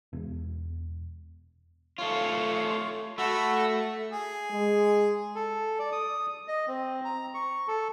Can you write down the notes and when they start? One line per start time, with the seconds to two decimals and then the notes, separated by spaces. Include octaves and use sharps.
0.13 E1
1.98 A3 F4 C#5 F5
3.18 A3 F#4 B5 E6
4.11 G#4
4.50 G#3
5.35 A4
5.79 D5
5.92 D#6
6.48 D#5
6.67 C4
7.05 A#5
7.34 C#6
7.68 A4